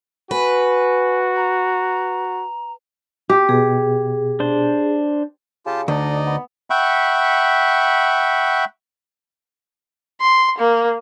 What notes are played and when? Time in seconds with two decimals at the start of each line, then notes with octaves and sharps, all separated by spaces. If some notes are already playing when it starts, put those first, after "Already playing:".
0.31 F#4 B4 G#5
1.36 A#5
3.30 G4
3.49 B2 G#4
4.40 D4 C5
5.66 C#3 F4 G4 A5
5.88 D2 D3 D#4 D5 D#5
6.27 B3
6.70 E5 F#5 G5 B5 C#6
10.21 C6
10.58 A#3